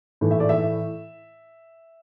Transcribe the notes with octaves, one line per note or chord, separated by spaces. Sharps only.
A2 E3 A3
E5
D5
E5